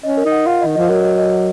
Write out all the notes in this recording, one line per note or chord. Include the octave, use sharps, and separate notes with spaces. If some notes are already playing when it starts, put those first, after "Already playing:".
C#4 D#5
A#4
D#4
F#5
F4 F#5
D#3 D#5
F3 D#5
F#3 A#4
D#5
D#5
F#5